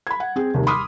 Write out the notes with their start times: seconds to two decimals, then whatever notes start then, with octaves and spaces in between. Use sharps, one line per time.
0.07 B5 G#6
0.20 F#5
0.36 C4 G#4
0.54 F1 D#2 C3
0.67 B5 C6 D6 D#6 F6